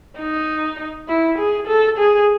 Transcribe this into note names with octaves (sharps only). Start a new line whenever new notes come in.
D#4
E4
G#4
A4
G#4